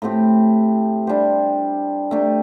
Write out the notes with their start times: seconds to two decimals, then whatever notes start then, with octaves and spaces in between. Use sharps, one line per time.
0.02 A2 A3 C4 G4
1.07 G3 D4 G4 C5
2.11 C3 A3 D4 G4